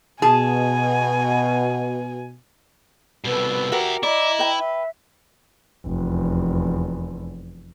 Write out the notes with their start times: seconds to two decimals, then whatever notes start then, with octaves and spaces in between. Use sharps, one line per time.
0.22 B2 G#4 G#5 A5
3.25 C2 B2 A4 B4
3.72 F#4 G4 A#4 E5 F#5
4.03 E4 D5 D#5 A#5
4.39 B4 G5
4.58 E5
5.86 F1 E2